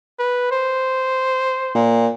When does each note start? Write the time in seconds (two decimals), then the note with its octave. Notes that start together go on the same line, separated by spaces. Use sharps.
0.20 B4
0.51 C5
1.75 A#2